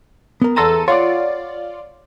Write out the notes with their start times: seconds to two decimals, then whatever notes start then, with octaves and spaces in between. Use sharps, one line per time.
0.42 B3 A#4
0.56 E2 A4 A5 A#5 C6 D#7
0.88 F4 C#5 D5 F#5